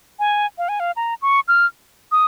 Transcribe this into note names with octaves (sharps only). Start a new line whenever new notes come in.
G#5
F5
G#5
F5
A#5
C#6
F6
D#6